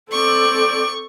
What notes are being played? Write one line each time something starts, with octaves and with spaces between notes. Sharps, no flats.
C4 A4 D5 C#6